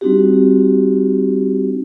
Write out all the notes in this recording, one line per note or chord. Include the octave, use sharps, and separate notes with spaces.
G3 C4 D4 D#4 F#4 G4